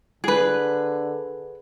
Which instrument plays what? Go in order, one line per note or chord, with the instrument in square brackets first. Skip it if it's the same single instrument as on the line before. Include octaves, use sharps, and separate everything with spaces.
[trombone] D3 [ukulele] G#4 B4